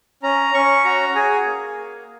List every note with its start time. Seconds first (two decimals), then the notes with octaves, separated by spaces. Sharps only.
0.23 C#4 A#5
0.54 C#4 C#6
0.84 F#4 A#5
1.15 G#4 G#5
1.46 A#3